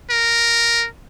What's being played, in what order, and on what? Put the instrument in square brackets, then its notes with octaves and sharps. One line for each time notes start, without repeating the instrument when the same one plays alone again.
[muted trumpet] A#4